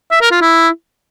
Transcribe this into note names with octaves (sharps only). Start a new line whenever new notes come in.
E5
A#4
F4
E4